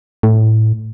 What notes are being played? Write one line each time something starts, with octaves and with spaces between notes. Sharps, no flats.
A2